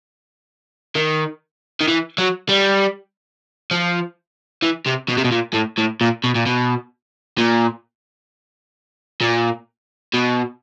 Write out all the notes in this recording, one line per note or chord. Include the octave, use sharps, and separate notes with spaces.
D#3
D#3
E3
F#3
G3
F3
E3
C3
B2
C3
B2
A#2
A2
A2
A#2
B2
A#2
B2
A#2
A#2
B2